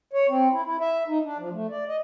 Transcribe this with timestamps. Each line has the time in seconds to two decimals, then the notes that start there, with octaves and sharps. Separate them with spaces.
0.13 C#5
0.29 C4
0.52 E4
0.65 E4
0.81 E5
1.08 D#4
1.25 D4
1.39 F3
1.53 A3
1.70 D5
1.89 D#5